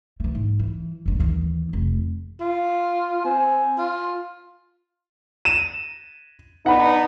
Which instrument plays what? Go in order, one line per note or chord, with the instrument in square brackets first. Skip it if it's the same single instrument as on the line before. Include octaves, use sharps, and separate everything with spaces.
[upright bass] E3 A3
G#2
E3
F#1 G2
D#2 E3
F1
[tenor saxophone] F4
[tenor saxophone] C4 [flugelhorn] G#5
[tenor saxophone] F4
[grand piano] D#7 E7
[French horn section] B3 D4 D#4 [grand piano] F#5 B5